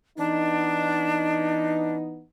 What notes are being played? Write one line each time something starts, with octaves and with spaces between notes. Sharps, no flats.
E3 B3 D4 D#4